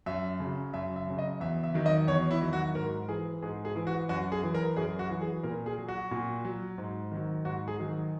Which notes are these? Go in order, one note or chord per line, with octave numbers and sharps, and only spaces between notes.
F#2 E5
C#3 F#3
F#2 E5
E5
C#3 F#3
D#5
E2 E5
E5
D#3 F#3
D#5
E2 C#5
E4
D#3 F#3
F#4
G#2 A#4
E3 G#4
G#2 G#4
G#4
E3
F#4
F#2 F#4
G#4
E3
A#4
F#2 G#4
F#4
E3
G#4
A#2 A#4
G#4
F#3
F#4
A#2
F#3
G#2
D#3 F#3
G#2 F#4
G#4
D#3 F#3